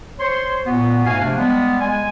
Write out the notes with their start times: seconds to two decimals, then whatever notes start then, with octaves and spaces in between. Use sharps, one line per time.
0.19 C5 C#5 C6
0.66 A#2 B3 F#4
1.05 G#2 A3 F#4 F5 G#5
1.19 C3 F3 A3 A#3 D4
1.37 G3 G#3 B3
1.80 G#3 G#5